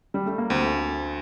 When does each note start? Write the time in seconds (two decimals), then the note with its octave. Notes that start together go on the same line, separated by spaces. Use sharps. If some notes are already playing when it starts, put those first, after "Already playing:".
0.14 G3
0.26 A3
0.38 A#3
0.50 D2 C4